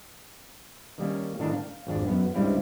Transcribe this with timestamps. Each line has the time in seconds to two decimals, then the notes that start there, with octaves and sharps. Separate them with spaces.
0.98 D#3 G3 A#3 C#4
1.39 A2 D#3 D4 A5 A#5
1.53 F5
1.87 G#1 F2 D4
2.07 F#2 B3
2.34 C#2 G2 G3 C4 E4 F5